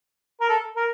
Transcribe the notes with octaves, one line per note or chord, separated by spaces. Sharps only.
A#4
A4
A#4